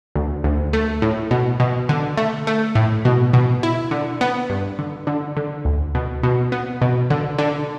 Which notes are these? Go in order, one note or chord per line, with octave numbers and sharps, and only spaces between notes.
D2
D2
A3
A2
B2
B2
D3
A3
A3
A2
B2
B2
E4
D3
B3
G2
D3
D3
D3
D2
B2
B2
B3
B2
D3
D3